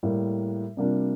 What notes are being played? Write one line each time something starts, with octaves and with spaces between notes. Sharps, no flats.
A2 G3 A#3
C3 G3 A#3 D4 F4